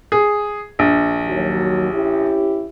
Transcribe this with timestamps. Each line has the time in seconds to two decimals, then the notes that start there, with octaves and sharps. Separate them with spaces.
0.12 G#4
0.79 A#1
1.26 D#2 F#3
1.92 C#4 E4 G4